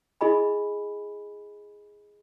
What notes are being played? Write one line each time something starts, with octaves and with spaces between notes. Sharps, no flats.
E4 G#4 D#5 G#5 B5